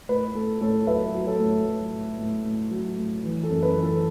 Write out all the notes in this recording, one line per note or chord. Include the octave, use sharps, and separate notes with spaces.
A2 B4
A2 A4
A2 A4 C#5
F#3 B4 E5
F#3
A4 C#5
A2
F#3
A2
A2
A2
F#3
A2
E3
A4
F#2
B4
E3
A4